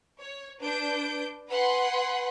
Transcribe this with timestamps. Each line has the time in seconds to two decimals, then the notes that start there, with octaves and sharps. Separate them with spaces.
0.18 C#5
0.60 D4 B4 G6 D7
1.48 B4 F#5 G#5 B5 C6